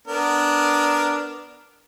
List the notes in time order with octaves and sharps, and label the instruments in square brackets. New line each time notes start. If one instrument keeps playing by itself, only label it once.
[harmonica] B3 D4 A#4